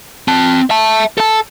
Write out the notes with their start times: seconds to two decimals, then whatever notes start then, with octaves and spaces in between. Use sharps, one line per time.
0.28 C4 A5
0.70 E5 A5
1.18 A4 A5